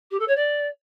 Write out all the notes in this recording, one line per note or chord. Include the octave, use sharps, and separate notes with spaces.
G4
A4
C#5
D5